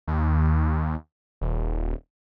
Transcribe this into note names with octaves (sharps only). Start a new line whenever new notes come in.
D#2
D#1